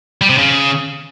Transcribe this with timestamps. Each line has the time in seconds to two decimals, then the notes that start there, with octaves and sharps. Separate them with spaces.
0.21 G3
0.30 C3
0.38 C#3